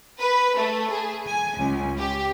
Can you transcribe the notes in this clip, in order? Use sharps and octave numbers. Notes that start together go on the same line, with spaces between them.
B4
A3
G#4
G#5
C#2
G4